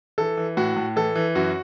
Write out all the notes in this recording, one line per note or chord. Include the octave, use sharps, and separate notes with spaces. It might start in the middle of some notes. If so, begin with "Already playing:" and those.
E3 A4
E3
A2 F#4
A2
E3 A4
E3
F#2 F#4